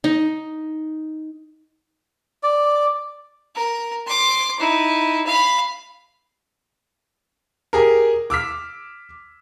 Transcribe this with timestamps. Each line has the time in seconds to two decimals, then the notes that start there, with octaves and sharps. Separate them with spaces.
0.04 D#4
2.43 D5
3.55 A#4
4.07 C6 D6
4.60 D#4 E4
5.27 F5 B5
7.73 G4 G#4 A#4
8.30 D6 E6 F6 B6